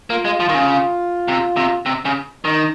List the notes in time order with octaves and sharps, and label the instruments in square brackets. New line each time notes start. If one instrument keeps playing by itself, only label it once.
[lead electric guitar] A#3 [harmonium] F4
[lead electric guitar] G#3
F3
D#3
C#3
C3
C3
C3
C#3
[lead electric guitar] D#3 [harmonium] D#4